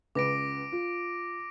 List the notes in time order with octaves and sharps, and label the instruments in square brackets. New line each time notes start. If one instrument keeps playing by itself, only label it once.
[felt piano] C#2 B4 [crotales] D6 A#6 D7
[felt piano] F4